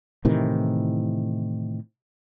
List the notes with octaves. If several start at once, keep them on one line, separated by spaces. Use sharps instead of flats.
A2 C3 D#3 E3